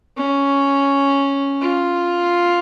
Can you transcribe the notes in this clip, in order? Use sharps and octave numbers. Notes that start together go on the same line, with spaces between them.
C#4
F4